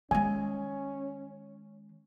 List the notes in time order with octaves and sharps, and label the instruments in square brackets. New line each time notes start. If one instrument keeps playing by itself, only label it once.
[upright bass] D#3 G#3 [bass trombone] C#4 [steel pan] G#5